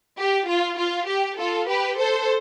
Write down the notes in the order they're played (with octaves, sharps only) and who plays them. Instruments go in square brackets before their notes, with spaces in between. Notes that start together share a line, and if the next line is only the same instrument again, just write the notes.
[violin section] G4
F4
F4
G4
F4 A4
G4 B4
A4 C5